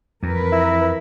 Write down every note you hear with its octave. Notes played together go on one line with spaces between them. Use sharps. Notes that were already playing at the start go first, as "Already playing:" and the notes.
F2 E3 A#4 B4
E4